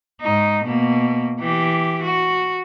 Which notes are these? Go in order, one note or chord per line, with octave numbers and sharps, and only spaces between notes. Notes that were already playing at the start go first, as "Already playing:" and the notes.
G#2 D#4
B2 A#3
E3 G4
F#4